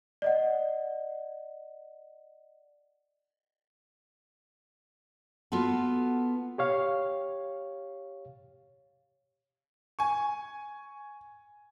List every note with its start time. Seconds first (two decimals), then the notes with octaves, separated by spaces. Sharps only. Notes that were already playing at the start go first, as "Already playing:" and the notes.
0.22 D5 D#5 F#5
5.52 B3 F4 F#4 A4
6.58 G4 C#5 F5
9.99 G#5 C#6